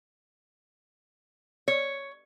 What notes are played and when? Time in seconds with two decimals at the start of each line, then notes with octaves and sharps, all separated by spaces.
1.68 C#5